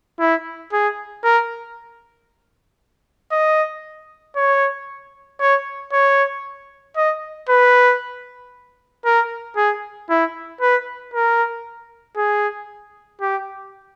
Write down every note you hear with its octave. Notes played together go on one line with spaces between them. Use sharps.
E4
G#4
A#4
D#5
C#5
C#5
C#5
D#5
B4
A#4
G#4
E4
B4
A#4
G#4
G4